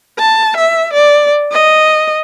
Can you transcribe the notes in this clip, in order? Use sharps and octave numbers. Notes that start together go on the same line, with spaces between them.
A5
E5
D5
D#5